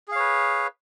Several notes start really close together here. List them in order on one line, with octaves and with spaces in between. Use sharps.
G#4 F5 C#5 B4